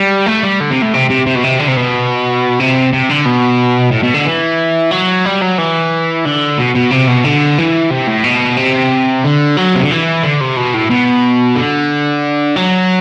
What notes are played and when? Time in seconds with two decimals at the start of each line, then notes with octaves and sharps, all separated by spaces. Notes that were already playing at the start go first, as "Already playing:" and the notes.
Already playing: G3
0.26 A3
0.43 G3
0.60 D3
0.71 C3
0.82 A2
0.94 C3
1.10 C3
1.26 C3
1.35 B2
1.44 C3
1.59 D3
1.68 C3
1.77 B2
2.60 C3
2.93 C3
3.09 D3
3.26 B2
3.92 A2
4.03 B2
4.14 D3
4.26 E3
4.91 F#3
5.26 G3
5.42 F#3
5.58 E3
6.25 D3
6.58 B2
6.75 B2
6.91 C3
7.08 B2
7.24 D3
7.58 E3
7.90 C3
8.07 A2
8.24 B2
8.57 C3
9.24 D3
9.57 F#3
9.75 C3
9.83 D3
9.91 E3
10.23 D3
10.41 C3
10.57 B2
10.74 A2
10.90 B2
11.56 D3
12.56 F#3